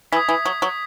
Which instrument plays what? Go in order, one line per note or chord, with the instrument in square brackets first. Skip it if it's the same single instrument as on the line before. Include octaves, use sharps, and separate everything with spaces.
[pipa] E3 [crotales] B6
[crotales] D#6 G#6
[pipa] E3
F#3
F#3